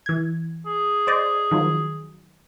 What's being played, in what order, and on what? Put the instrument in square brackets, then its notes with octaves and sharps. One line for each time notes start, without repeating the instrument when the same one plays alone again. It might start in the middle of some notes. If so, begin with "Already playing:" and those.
[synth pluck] E3 G#6
[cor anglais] G#4
[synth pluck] C5 D5 D#5
D#3 F3 F#3